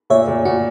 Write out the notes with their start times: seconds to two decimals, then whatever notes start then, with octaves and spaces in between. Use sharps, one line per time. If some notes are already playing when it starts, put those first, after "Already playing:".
0.10 A#2 C#5 E5
0.28 A#2
0.45 A#2 F#4